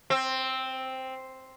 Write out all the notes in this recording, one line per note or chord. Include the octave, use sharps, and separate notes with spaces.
C4